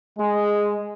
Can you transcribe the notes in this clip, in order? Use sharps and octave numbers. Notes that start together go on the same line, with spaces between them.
G#3